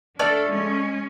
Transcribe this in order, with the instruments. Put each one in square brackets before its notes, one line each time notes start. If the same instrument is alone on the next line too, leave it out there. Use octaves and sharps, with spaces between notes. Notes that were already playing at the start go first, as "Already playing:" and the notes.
[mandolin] A3 D5 F6 [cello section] D4 A4
[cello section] G#3 C#4